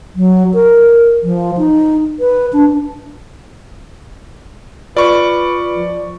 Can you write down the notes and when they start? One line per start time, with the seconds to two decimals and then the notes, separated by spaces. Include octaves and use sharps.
0.16 F#3
0.54 A#4
1.23 F3
1.58 D#4
2.19 B4
2.53 D4
4.97 F4 B4 D5 C#6
5.73 F3